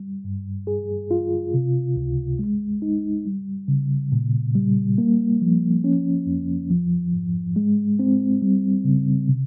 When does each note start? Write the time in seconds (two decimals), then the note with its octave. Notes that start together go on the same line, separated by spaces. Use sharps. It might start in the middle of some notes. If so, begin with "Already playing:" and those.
Already playing: G3
0.24 G2
0.67 G#4
1.11 F4
1.54 C3
1.96 C#2
2.39 G#3
2.82 D#4
3.25 G3
3.68 C#3
4.12 A#2
4.55 G3
4.98 A#3
5.41 F3
5.84 C#4
6.27 F2
6.70 F3
7.13 G#2
7.56 G#3
7.99 C4
8.42 G3
8.84 C#3
9.29 C3